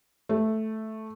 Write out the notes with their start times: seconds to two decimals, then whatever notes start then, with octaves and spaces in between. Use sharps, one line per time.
0.29 A3